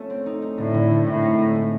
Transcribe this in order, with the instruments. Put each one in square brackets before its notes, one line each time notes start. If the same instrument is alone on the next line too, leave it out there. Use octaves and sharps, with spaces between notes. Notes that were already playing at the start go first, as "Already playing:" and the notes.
Already playing: [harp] A3 C#4 F4
C4
D#4
D#4
[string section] A2 [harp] D3
[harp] D3
C4
[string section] A2 [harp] G#3
[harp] D#4
D#4
G#3